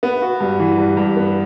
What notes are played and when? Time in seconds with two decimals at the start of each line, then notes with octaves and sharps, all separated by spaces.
0.03 B3
0.22 F#4
0.40 G2
0.59 E3
0.78 G2
0.97 G2
1.17 B3